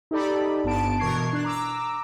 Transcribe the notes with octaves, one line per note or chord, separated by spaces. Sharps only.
D#4 G4 A4 D5 B5
G1 G2 B3 A5 D7
B2 E3 A#4 C#6 G#6 C7
D4 F#6
A#5 D6 E6